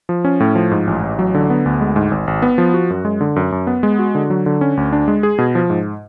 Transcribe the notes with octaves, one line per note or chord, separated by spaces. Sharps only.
F3
C#4
A2
F3
G#2
A1
A1
F#3
D3
B3
D2
G#3
G#2
G#1
G#1
B3
F3
F#4
F#2
G#3
D3
F#2
F#2
B3
G#3
F#4
D3
F#3
D3
C#4
D2
D4
G#3
G#4
B2
F3
G#2